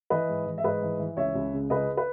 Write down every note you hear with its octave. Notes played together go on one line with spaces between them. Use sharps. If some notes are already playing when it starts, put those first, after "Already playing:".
E3 B4 D#5
G#2
E3
E5
G#2 B4 D#5
E3
E3
C#2 C#5 E5
C#2
C#3
C#2 B4 D#5
B4